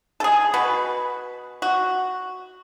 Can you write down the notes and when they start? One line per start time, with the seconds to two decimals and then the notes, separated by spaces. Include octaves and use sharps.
0.20 G#4 A4
0.54 B2 F#4 B4
1.62 F#4